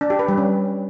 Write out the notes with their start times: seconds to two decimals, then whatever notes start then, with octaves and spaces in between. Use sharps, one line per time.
0.01 D4
0.10 G4
0.19 B4
0.28 G3
0.38 C#4